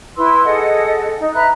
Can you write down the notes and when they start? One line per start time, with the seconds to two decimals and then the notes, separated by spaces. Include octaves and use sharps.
0.16 E4 B4 C6 E6
0.45 G#4 A4 D#5 F#5
1.18 D#4
1.34 B4 E5 A#5 F#6